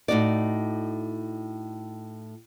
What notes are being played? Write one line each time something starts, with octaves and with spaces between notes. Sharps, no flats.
A2 D#4 F#4 D5